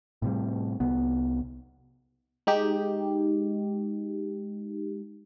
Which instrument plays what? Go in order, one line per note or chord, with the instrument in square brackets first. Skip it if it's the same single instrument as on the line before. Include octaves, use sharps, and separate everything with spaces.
[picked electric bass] A2 C3 G3
C2 B3
[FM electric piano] G#3 D#4 G4